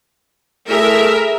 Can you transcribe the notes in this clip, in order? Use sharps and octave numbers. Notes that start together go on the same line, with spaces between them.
A3 E4 G#4 A#4 E5